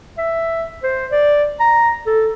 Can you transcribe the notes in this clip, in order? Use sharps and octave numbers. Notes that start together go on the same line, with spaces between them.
E5
C5
D5
A#5
A4